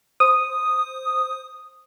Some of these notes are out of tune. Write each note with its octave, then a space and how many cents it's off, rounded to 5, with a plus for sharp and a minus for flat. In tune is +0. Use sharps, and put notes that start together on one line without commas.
C5 +0 D#6 -5